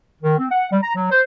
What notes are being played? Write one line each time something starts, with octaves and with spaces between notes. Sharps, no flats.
D#3
C4
F#5
G3
A#5
F#3
C5